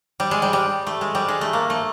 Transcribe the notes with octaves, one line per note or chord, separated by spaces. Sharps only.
G3
G#3
G3
G3
A3
G#3
G3
G#3
A3
A#3
A3